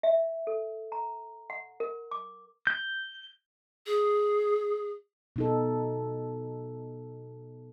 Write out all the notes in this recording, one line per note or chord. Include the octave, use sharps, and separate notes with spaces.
E5
A4
A#5
F#5
A#4
D6
G6
G#4
B2 D#4 A4